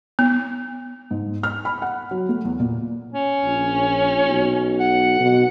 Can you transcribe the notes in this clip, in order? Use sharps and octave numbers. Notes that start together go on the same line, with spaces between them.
B3
G#2
F6
B5
F#5
F#3
A3
E2
A#2
C#4
A#1
B1
F#5
B2